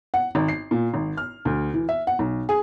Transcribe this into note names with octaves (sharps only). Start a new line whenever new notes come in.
F#5
G#1
C7
A#2
G#1
F6
D2
E3
E5
F#5
B1
G#4